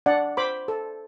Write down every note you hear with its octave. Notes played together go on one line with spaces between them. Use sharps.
D4 D5 F#5
C5 B5 D6
A4